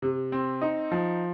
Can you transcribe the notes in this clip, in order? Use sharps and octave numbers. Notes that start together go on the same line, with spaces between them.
C3
C4
D#4
F3